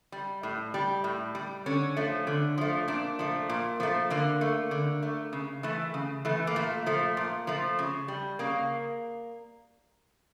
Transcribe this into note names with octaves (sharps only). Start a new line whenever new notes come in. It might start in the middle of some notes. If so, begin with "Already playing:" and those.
G3
A2
G3
A2
G3
D3 C#4
F3 A3
D3
F3 A3
A#2 D4
F3 A3
A#2
F3 A3
D3 A#3
A3
D3
A3
C#3
E3 A3
C#3
E3 A3
A#3
A#2 A3
F3 A3
A#2
F3 A3
C#3
G3
C#3 A#3